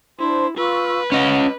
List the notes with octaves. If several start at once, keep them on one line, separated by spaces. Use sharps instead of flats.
D4 E4 C5 C6
F4 B4 C#6 E6
C#4 D#5 F#5